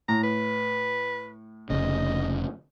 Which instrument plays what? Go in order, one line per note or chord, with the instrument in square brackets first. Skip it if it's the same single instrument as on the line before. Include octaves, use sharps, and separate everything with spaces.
[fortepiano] A2 [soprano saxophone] A#5
[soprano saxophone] B4
[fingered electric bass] F1 A#1 C#3 [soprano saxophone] D#5